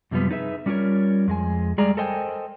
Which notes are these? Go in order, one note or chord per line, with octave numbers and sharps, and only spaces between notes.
F#2 C3 F3 G3 B3
D#4 G#4 B4 E5
G3 C#4 F4 G4 A#4 C#5
F2 G#3 G#5
G3 G#3 G#4 D5 A#5
A4 A#4 C5 D#5 G5 G#5